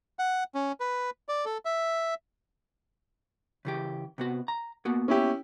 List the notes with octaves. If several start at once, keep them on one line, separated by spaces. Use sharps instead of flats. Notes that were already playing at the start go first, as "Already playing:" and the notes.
F#5
C#4
B4
D5
A4
E5
C#3 E3 G4
C3 B3 F#4
A#5
A#3 B3 F#4
C#4 E4 G4